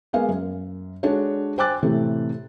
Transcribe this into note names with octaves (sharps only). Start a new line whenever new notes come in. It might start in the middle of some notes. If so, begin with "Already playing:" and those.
G#3 A#3 B3 A#4 F5 G#5
F#2
G#3 D4 F#4 A4 C#5
C5 G5 G#5 D6 F#6 A6
A2 C3 E3 A3 C4